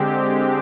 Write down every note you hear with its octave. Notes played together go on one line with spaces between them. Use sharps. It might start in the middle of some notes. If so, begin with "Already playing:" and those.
Already playing: D3 G#3 C4 G4